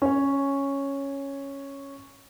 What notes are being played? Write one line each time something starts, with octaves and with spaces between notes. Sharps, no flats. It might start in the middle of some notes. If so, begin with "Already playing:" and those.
C#4 C#5